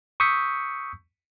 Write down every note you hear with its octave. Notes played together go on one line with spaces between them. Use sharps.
C#6 D#6 E6 G6 B6 C#7